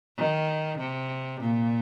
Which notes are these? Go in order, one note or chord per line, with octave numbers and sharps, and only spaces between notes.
D#3
C3
A#2